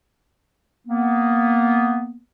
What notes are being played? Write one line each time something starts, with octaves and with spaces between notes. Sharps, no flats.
A#3 B3